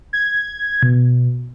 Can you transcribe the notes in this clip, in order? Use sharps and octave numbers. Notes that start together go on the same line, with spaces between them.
G#6
B2